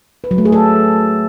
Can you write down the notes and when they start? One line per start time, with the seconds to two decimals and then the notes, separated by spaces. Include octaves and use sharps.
0.24 B4
0.31 F#3
0.38 A3
0.45 G#4
0.52 A4